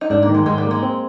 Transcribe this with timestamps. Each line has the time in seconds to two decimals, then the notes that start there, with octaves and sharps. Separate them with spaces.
0.01 D#4
0.10 G#2 D4
0.23 A#3
0.29 D#3
0.34 G#3
0.46 G#2 G#3
0.58 G3
0.65 A#3
0.71 G#3
0.83 C4